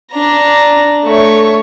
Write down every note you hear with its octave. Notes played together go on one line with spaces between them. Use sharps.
D4 A#5
A3 C#5